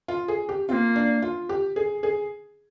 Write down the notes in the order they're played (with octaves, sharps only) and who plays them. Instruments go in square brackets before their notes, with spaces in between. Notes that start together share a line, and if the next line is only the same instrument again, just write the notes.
[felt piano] F4
G#4
G4
[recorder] C4 [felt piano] F4
[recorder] A#3
[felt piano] D4
F4
G4
G#4
G#4